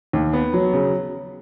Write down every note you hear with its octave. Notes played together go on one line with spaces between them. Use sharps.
D#2
B3
F#3
C#3